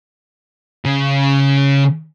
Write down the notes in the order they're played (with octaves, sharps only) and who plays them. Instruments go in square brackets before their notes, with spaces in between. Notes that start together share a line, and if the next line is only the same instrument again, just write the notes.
[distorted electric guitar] C#3